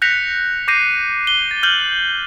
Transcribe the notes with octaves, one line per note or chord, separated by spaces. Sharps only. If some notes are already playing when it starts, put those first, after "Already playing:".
F#6 G6 A#6 B6 C#7 F7
D6 G6 A#6 C7 D#7
G7
A6
F6 G6 F#7 G7